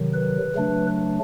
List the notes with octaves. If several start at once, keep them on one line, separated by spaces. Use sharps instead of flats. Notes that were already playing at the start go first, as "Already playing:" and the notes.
Already playing: C3 D#3 F#3
B4
C#3 F#3 A3 D4